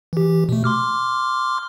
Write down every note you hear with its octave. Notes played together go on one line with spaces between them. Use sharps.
E3 G4
B2 A3
C6 D6 F6